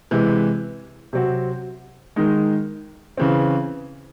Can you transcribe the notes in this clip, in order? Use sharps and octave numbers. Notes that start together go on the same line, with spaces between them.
C3 E3 G#3
C3 F#3 C4 F#4
D#3 G#3 D#4
C#3 E3 C4